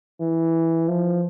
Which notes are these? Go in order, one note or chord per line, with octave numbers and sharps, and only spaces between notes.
E3
F3